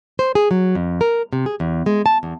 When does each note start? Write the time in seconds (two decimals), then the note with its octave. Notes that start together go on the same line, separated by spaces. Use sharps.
0.19 C5
0.35 G#4
0.51 F#3
0.75 F2
1.01 A#4
1.33 C3
1.46 G#4
1.60 E2
1.86 G#3
2.06 A5
2.23 E2